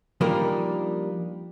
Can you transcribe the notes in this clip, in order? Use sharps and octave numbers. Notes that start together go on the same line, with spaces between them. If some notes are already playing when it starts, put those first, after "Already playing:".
F3 G3 A#3 D4 D#4 A#4